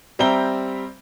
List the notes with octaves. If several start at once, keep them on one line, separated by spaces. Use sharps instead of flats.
G3 C4 E5 G5 A#5 G7